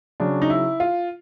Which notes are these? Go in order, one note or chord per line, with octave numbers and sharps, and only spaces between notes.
C#3 F#3 D4
D#4
E4
F4